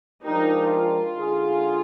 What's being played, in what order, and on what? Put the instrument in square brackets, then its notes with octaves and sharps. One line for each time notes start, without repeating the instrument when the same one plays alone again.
[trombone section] F3 G#3 D4 G4 A#4 [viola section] D#4
[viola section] F4
[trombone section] D3 G#3 D#4 G#4